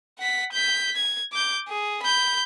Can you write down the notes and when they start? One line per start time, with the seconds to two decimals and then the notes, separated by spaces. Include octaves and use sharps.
0.19 F#5 B6
0.53 G6 B6
0.96 G#6
1.32 D6 G6
1.69 G#4
2.03 B5 G6